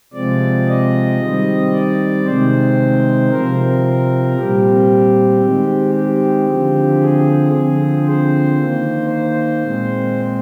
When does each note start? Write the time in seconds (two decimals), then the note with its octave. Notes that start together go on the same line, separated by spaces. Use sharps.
0.13 C3 F3 G#3 C4 D5
0.67 D#5
1.19 D#3 G3 C4
1.71 D5
2.24 C3 D#3 G#3 C4 C5
3.30 C3 F3 C4 A#4
4.36 A#2 G3 C4 G4
5.41 D#3 G#3 C4
5.94 G4
6.47 D3 F3 C4
7.00 G#4
7.52 D3 F3 C4 G#4
8.05 C5
8.58 D#3 A#3
9.10 C5
9.63 A#2 G#3 C4